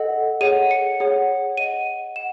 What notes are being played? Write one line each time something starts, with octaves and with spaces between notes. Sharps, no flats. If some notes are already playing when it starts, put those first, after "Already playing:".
Already playing: A4 D#5 F#5
G#4 C#5 F#5 D#7
C#7
G#4 C#5 F#5
G#4 D#5 F#5 D#7
F#5 E7